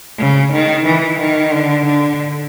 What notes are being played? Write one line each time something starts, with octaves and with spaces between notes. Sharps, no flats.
C#3
D#3
E3
D#3
D3
D3